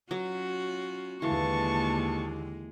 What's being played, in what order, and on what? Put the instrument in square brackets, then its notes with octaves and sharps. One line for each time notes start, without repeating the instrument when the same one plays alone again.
[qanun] F#3 [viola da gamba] C#4 F4 F#4
[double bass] D#2 D3 [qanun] E3 F5 [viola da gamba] G#3 A#3 [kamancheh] A5 C#6